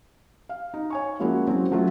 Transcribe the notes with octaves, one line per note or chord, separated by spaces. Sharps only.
F5
D#4
C#5 G#5 C#6
F3 G#3 A#3 C#4 E4 F#4
F#3 C4 C#4
F#3 A3 C#4 F4